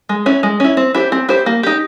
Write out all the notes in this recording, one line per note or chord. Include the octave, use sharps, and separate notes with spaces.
G#3
C#4 E4
G#3
C#4 E4
C4
E4 G4 C5
C4
E4 G4 C5
A#3
D#4 G4